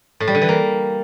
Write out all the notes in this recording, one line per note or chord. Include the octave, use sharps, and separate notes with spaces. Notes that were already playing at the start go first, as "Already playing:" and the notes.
A2
G3
D3
E3
A#3